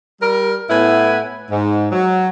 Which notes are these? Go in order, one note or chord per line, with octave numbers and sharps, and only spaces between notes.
G3 A#4
A2 B3 E4 B4 G#5
G#2
F#3